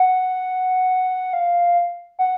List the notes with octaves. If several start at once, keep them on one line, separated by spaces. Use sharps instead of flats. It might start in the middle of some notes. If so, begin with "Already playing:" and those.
Already playing: F#5
F5
F#5